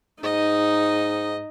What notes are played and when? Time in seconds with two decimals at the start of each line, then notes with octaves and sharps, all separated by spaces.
0.24 G#2 D#4 D#5